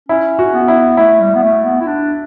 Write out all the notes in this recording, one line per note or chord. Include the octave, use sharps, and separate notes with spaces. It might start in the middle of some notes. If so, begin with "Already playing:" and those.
C#4 E4
F#4
B3
E4
A3 E4
G3
B3
A3
B3
E4
D4